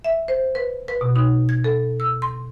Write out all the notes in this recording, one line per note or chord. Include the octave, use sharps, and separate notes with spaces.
E5
C5
B4
B4
B2
D#4
G#6
A4
E6
C6